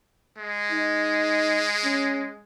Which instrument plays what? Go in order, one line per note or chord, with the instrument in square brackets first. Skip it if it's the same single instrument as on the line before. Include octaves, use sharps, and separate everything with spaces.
[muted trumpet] G#3
[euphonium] D#4
C#4